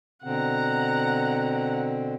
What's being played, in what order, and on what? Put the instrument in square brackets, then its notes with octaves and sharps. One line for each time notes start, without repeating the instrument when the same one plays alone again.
[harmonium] B2 D3 C4 [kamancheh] F#5 A#5